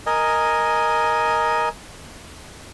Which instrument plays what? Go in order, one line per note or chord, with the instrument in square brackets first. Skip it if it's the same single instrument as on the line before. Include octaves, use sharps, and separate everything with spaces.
[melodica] A#4 D#5 G#5